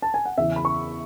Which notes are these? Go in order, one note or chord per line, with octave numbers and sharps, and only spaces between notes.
A5
G#5
F#5
E2 C#3 E3 E5
B5
C#6